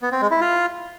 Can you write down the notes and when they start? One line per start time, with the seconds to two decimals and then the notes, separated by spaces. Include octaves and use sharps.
0.02 B3
0.12 C4
0.21 G#3
0.31 E4
0.41 F4